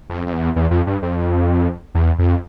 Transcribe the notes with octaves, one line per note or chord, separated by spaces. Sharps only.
F2
F2
E2
E2
F2
G2
F2
E2
F2